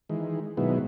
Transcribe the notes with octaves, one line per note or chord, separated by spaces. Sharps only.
D#3 E3 G#3
B2 D#3 F#3 G#3 B3 E4